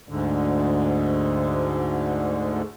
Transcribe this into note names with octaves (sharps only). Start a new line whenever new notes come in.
D2 G#2 D3